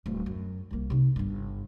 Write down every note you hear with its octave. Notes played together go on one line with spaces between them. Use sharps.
D1 G3
F#2
C2 A#3
C3 D#4
G1 G2